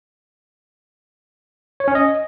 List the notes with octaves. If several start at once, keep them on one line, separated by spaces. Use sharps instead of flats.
C#5
C#4
D#5